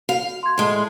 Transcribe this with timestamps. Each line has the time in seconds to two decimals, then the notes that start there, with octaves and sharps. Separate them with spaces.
0.09 F#4 F5
0.43 C6 G#6
0.58 A2 G#3